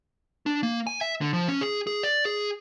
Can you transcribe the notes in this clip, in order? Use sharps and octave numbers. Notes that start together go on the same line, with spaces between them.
D4
A#3
G#5
E5
D3
F3
C#4
G#4
G#4
D5
G#4